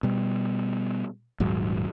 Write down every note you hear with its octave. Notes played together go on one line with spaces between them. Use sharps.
B2 G3
D#1 G#2 F#3